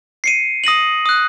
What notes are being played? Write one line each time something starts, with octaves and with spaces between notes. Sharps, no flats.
C7 C#7 D#7
D#6 A#6 D#7 F#7
D#6 F#6